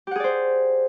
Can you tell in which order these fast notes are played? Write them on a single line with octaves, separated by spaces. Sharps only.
G4 F#5 G#4 D5 C5